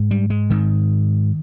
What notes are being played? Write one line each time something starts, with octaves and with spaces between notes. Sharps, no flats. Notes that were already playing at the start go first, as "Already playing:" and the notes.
Already playing: G#2
G3
G#3
G#2 D#3